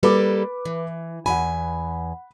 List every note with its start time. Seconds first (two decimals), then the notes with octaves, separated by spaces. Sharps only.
0.03 G3 A#3 A4 B4 B5 D6
0.65 E3
1.26 E2 F#5 G#5 B5